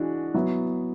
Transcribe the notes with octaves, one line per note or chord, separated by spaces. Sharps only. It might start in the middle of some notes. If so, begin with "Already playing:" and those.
Already playing: E3 G#3 D4 F#4
F#3 B3 E4